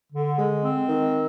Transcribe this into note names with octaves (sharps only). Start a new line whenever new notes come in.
D3
G#3
C4
D#3